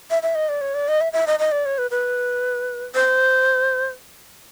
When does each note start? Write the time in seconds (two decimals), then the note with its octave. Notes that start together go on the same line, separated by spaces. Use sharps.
0.10 E5
0.23 E5
0.35 D#5
0.49 D5
0.61 C#5
0.74 D5
0.88 D#5
1.01 E5
1.13 E5
1.27 D#5
1.39 D#5
1.52 D5
1.66 C#5
1.78 B4
1.91 B4
2.95 C5